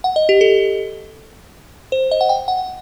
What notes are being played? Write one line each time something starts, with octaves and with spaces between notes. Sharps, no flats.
F#5
D#5
G4
A4
C5
D#5
F#5
G5
F#5